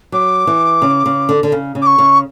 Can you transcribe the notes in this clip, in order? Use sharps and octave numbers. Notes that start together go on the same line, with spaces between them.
F#3 D6
E3
C#3
C#3
D3
D3
C#3
C#3
D6
C#6
C#3